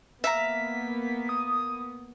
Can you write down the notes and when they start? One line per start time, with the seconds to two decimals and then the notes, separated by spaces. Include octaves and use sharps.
0.24 A#3 B3 E5 F5 A#5 B6
1.29 D#6